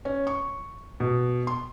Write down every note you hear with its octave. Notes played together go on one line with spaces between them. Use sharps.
C#4
C#6
B2
C6